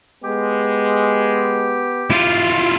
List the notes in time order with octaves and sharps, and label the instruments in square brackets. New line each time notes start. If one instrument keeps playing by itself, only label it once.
[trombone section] G#3 [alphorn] B3 [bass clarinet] G4
[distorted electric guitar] E4 F4